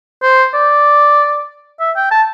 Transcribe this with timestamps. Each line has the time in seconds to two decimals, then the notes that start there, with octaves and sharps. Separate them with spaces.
0.23 C5
0.54 D5
1.80 E5
1.96 G5
2.11 A5